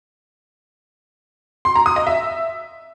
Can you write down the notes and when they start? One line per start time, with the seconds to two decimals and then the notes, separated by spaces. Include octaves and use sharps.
1.65 C6
1.75 A#5
1.86 D#6
1.96 D#5
2.07 E5